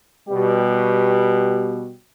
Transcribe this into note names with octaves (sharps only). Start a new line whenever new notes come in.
B2 G3 B3 G4